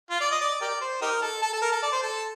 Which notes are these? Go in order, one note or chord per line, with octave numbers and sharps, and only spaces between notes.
F4
D5
D#5
D5
G4 A#4 D5
C5
D#4 G4 A#4
A4
A4
A4
A#4
A4
D5
C5
A4